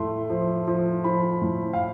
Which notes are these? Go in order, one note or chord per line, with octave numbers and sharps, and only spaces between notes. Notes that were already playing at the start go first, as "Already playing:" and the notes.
Already playing: A2 A3 C6
F3
F3
F3 B5
A2
F5